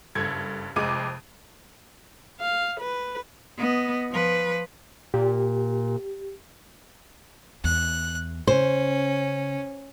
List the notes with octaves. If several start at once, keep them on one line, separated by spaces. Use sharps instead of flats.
F#1 G2 A4 G#6
F1 F2 G#3 D6 D#7
F5
B4
B3 D#5
F3 B4
A#2 G4
E2 F#6
C#3 C#4 C5